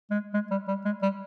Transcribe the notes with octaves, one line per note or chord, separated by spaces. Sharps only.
G#3
G#3
G3
G3
G#3
G3